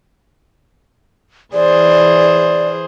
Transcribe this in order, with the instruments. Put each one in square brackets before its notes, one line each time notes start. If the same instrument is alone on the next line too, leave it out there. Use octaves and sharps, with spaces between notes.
[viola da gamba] E3 G#4 C5 [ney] D5